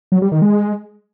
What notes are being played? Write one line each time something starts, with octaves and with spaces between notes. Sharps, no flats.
F#3
G3
D#3
G#3